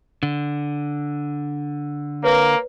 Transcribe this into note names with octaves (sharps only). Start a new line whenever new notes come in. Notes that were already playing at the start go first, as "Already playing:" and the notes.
D3
A#3 B4 C#5